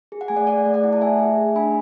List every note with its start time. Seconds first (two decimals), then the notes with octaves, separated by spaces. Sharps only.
0.12 G#4
0.21 F#5
0.28 A3 G#5
0.36 D5 F#5
0.47 G#4 D5 F#5
0.66 A3
0.74 D5 F#5
0.84 E4
0.93 A5
1.01 A3 E5 G#5
1.19 G#4
1.37 A3
1.55 D4 G#5 B5